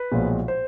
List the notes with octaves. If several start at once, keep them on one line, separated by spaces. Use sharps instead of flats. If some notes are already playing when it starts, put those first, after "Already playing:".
Already playing: B4
B1 A#2 F3 G#3
C5